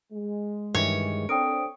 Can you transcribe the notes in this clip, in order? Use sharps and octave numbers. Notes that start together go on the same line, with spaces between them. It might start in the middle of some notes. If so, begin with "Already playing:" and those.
G#3
G2 D#3 E3 C#5
C4 D4 A4 A#4 G5 D#6 D7